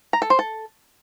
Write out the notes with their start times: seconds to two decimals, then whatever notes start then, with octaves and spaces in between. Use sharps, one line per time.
0.13 A#5
0.22 A4
0.30 C5
0.39 A4